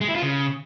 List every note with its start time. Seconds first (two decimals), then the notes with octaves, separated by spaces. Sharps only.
0.01 G#3
0.08 E4
0.15 F4
0.23 C#3